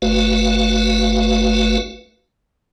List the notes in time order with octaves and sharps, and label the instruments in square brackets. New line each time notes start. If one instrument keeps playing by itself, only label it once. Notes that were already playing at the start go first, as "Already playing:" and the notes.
[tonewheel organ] G1 A3 F#4 B4 F5